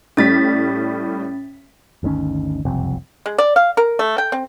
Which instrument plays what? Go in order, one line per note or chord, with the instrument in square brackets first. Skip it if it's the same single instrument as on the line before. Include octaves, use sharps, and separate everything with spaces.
[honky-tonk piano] A2 G3 B6 [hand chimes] C#4 A6
[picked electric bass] G1 D2 D#3 C#4
F#1 C2 F2 C3
[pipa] G#3
D5
F5
A#4
A3
G5
C4